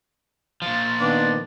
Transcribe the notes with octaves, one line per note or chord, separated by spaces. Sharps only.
A#2 F3 A6
D#3 B3 D4